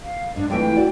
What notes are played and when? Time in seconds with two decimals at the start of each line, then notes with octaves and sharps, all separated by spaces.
0.01 F5
0.36 G#2 D4
0.50 F2 E3 G#3 A3 G5
0.76 F#4 D5